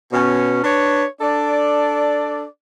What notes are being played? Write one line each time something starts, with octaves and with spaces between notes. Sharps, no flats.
B2 C#4
D4 B4 C#5
D4 A4 D5